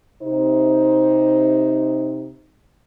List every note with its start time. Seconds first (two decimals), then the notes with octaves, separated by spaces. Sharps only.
0.23 C3 D#4 C5